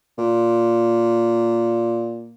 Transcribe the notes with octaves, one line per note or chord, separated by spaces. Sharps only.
A#2